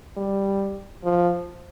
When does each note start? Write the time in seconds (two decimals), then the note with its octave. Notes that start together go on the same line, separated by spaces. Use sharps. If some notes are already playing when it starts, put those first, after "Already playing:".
0.17 G3
1.04 F3